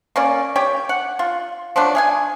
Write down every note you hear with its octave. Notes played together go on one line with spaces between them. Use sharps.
A#3 C#4 D5
G4 C#5 G5
F#5
F4
F3 F#3 A3 D4
G#4 F5 G#5